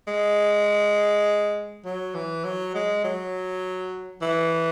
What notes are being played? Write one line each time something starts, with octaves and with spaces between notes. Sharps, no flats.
G#3
F#3
E3
F#3
G#3
F#3
E3